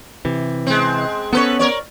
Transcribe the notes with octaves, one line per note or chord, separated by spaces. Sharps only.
C3 E3
G#3 C4
B3 C#4 A4 B4 C#5
A#4 C#5 D5